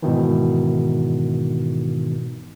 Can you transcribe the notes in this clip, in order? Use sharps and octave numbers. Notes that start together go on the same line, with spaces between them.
G#2 B2 D#3 E3